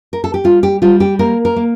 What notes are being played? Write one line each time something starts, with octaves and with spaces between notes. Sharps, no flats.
A#4
A4
G4
G3 F4
G4
G3 F4
G4
A#3 A#4
A#4
A#3